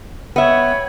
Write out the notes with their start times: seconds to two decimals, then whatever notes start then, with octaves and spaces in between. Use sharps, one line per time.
0.36 B3 C#5 E5 G5 B5